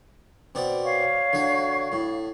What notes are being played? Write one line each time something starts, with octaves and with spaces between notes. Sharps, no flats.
B2 C4 D5
C#5 F5 C#6
D3 F#4
A2